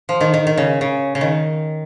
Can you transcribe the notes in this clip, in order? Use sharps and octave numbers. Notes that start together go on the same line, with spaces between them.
F3
D#3
D#3
D#3
C#3
C#3
C#3
D#3